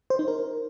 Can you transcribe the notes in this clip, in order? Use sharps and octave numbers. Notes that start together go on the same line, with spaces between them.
C5
D#4
A#4